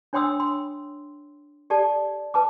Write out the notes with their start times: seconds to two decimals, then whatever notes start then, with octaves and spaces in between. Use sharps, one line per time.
0.13 D4 C#5 G5 C6 D#6 E6
0.40 C6
1.70 G4 A4 D5 A5
2.34 B4 A5 D6